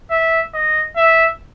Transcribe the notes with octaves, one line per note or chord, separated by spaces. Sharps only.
E5
D#5
E5